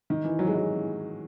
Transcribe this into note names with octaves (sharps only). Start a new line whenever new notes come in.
D#3
E3
F#3
G#3
F#3